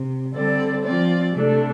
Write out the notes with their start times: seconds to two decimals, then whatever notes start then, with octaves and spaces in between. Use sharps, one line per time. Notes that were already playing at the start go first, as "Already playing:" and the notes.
Already playing: C3
0.34 D3 G3 C4 A4 D5
0.84 F3 C4 F4 D5
1.33 C3 A3 D4 A4